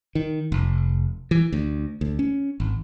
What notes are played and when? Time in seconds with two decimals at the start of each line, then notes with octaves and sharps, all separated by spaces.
0.15 D#3
0.52 F1
1.31 E3
1.52 D2
2.01 D2
2.19 C#4
2.60 G#1